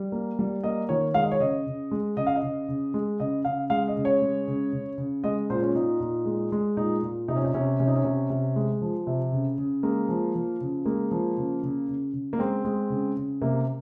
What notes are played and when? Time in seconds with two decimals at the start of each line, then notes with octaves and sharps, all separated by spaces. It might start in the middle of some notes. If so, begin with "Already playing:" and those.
Already playing: G3
0.12 A#3
0.39 G3
0.63 A#3 D#5
0.89 D#3 C#5
1.14 G#3 F5
1.23 D#5
1.31 C#5
1.40 C#3 D#5
1.66 C#3
1.91 G#3
2.17 C#3 D#5
2.27 F5
2.36 D#5
2.43 C#3
2.68 C#3
2.94 G#3
3.20 C#3 D#5
3.45 C#3 F5
3.70 G#3 F5
3.88 D#5
3.96 C#3
4.05 C#5
4.22 G#3
4.48 C#3
4.73 C#3
4.98 C#3
5.24 G#3 D#5
5.50 A#2 C5
5.62 C#4
5.75 A#2 D#4
6.00 A#2
6.26 G#3
6.52 G#3
6.77 A#2 D#4
7.02 A#2
7.28 C3 D#4
7.36 C#4
7.45 D#4
7.54 C3 C#4
7.80 C3 C#4
7.88 D#4
7.96 C#4
8.05 C3
8.30 C3
8.56 G#3
8.82 F3
9.07 C3
9.32 C#3
9.58 C#3
9.83 G#3 A#3
10.09 F3
10.35 F3
10.61 C#3
10.85 G#3 A#3
11.11 F3
11.37 C#3
11.63 C#3
11.89 C#3
12.13 C#3
12.33 A#3
12.39 G#3 C4
12.65 G#3
12.90 C#3
13.17 C#3
13.42 C3 A#3